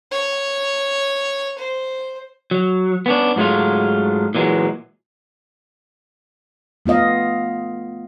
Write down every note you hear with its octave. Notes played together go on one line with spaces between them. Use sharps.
C#5
C5
F#3
B3 C#4 D4
G#2 F#3 G#3 A3 F4
A#2 E3 F#3 G#3
A3 B3 F4 D#5 F5